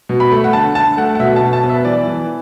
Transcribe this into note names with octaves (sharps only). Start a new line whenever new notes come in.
B2
B5
A3
F#5
D3 A5
D3 A5
A3 F#5
F#5
B2 E5
A5
B2
A5
B3
E5
E3 D5
E3